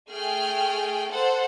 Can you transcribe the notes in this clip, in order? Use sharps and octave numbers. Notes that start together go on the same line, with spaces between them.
A3 G#4 G5 F6
A4 C5 F#5